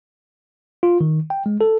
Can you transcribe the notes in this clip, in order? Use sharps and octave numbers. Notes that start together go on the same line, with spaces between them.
F4
D#3
G5
G#3
A4